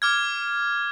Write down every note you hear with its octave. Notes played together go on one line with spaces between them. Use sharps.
D6 F6 G#6